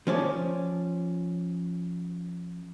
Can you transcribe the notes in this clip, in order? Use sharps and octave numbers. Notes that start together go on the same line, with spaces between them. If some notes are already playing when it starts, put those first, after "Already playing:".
F3 C#4 D5